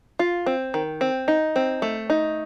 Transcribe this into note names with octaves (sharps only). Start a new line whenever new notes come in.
F4
C4
D#3
C4
D#4
C4
A3
D#4